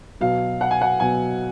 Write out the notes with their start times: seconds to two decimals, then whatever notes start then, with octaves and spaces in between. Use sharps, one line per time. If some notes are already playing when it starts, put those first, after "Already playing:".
0.21 B2 F#3 F5
0.61 F#5
0.71 G#5
0.81 F#5
1.00 B2 F#3 G#5